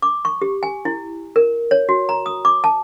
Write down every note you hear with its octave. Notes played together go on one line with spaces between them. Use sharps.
D6
C#6
G4
G#5
E4
A#4
C#5
F#4
A#5
D#6
D6
A5